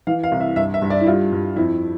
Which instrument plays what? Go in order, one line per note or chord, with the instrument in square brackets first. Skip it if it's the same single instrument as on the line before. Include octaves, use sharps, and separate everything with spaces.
[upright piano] E3 F5
F5
C2
E5
G2 E5
E5
G2
D5
E4
G3 F4
G2
F2 E4